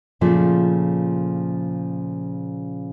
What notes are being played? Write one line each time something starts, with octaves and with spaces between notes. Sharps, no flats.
A#2 C#3 F3 A3